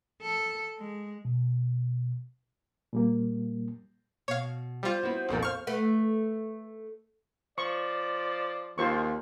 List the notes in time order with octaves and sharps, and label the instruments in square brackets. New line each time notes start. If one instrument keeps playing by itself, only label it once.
[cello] A4
G#3
[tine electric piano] B2
[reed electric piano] A#2 G3 A#3
[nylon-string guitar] B2 [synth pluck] C#5 F5
[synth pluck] G3 F4 [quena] C5
[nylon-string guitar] B3 E4 F#4
[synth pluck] C2 F2 A#2 [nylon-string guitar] D#4 A4 A#4
[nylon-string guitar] F5 [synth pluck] C#6 F6
[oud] A3 B4
[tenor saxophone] F3 [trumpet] D5 [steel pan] C#6
[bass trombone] D#2 [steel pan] F4 C5 C#6